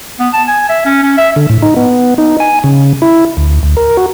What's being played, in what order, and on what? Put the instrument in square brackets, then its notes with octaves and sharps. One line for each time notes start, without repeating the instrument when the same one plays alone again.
[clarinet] B3
A5
G#5
E5
C#4
C#4
E5
[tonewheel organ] D3
A2
D#4
B3
D#4
G#5
C#3
E4
D2
D2
A#4
F#4